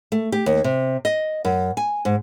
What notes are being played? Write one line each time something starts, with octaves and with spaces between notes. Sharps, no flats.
A3
G4
D#2
C3
D#5
F#2
G#5
G#2